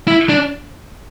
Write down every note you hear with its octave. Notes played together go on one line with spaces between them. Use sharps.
E4
D4